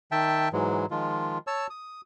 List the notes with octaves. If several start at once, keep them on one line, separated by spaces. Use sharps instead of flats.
D#3 E5 G5 A5
G#2 E3 F#3 G#3
D#3 F3 G#3 F4
C#5 A5 E6
D#6